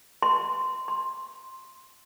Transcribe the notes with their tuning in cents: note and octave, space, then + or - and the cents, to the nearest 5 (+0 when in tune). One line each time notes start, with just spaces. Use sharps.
C6 -15
C6 +5